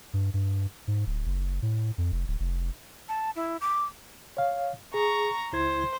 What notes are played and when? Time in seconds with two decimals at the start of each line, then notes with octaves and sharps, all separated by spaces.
0.13 G2
0.34 G2
0.88 G#2
1.06 D1
1.26 F#1
1.62 A2
1.98 F2
2.12 F1
2.28 D1
2.40 F1
3.09 A5
3.36 E4
3.61 D6
4.37 C#5 F5
4.94 G#4 A#5 C#6
5.53 C#2 E4 C5 G#6